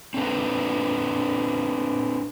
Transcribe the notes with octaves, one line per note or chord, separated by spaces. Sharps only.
C4 D4 A4 B4